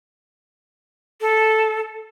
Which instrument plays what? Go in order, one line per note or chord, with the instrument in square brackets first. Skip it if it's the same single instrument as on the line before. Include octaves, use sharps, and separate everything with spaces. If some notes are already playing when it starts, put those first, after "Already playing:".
[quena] A4